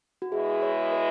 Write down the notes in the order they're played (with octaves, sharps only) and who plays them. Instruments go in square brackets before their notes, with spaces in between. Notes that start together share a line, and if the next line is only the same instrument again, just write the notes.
[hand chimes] F#4
[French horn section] B2 G#3 E4 [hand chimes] G#4
[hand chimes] C#5
B4